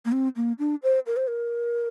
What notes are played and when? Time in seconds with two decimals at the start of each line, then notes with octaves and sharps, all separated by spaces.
0.05 A#3
0.12 C4
0.36 A#3
0.59 D4
0.83 C5
1.06 A#4
1.17 C5
1.27 A#4